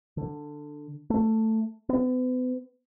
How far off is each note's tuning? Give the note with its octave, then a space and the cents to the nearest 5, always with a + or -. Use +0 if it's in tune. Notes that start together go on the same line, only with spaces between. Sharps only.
D3 +10
A3 +10
B3 +40